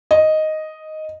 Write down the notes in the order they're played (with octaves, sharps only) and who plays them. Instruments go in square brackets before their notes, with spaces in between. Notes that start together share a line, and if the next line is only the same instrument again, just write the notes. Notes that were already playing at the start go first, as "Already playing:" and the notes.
[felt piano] D#5